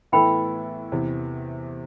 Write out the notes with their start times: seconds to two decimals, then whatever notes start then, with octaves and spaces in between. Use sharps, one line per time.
0.12 A2 E3 B3 E4 A4 G5 B5
0.92 E2 C3 E3